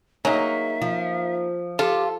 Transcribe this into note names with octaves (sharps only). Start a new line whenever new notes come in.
F#3 A#3 D#4 G#4 E5
F3
F4 G4 A4